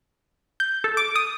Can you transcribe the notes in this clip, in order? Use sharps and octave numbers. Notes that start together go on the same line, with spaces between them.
G6
A4
D6
D#6